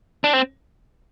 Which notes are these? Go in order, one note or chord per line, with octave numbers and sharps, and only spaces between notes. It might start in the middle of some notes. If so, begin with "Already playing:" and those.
D4
C4